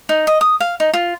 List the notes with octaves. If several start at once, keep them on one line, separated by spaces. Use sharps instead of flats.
D#4
D#5
D#6
F5
D#4
F4